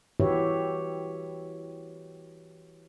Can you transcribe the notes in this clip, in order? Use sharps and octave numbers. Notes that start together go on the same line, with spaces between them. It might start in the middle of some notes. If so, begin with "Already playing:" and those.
E3 F#4 G4 B4 C#5 E5